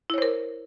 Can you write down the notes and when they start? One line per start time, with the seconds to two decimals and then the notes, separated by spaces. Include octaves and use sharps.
0.10 E4
0.14 C#5
0.18 C5
0.22 A#4